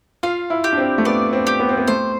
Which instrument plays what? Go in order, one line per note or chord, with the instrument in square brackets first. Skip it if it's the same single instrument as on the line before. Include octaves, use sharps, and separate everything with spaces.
[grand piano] F4 [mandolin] F5
[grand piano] E4
[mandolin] G4
[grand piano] D4
C4
A3
[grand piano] B3 [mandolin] D5
[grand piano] C4
[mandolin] G4
[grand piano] B3
C4
B3
[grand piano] A3 [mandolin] C5